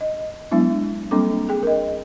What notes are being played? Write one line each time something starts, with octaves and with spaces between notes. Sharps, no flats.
D#5
F#3 G#3 B3 D4 E4
G3 A#3 C4 D4 A4 D6
G#4 G5
A#4 D#5